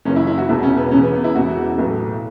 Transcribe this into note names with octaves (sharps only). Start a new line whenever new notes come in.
F#1 F#2 C#3 E3 C#4
E4
E4
F#4
E1 E2 B2 E4
C#4
B3
E1 E2 C#3 E3 C#4
B3
B3
E4
E1 E2 C#3 E3 F#4
B1 A2 E3